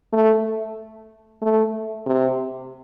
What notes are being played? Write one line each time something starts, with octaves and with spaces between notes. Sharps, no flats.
A3
A3
C3